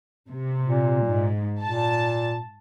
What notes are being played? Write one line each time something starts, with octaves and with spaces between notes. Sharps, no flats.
C3
A#2
G#2
A#2 A5